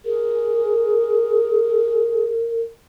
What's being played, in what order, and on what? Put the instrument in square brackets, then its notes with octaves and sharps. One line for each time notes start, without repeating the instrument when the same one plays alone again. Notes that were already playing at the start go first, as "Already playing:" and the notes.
[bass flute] G#4 [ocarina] A#4